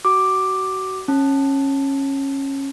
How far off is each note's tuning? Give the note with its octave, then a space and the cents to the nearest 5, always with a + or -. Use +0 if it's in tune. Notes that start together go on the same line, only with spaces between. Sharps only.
F#4 +30 D6 +5
C#4 -20 A5 -5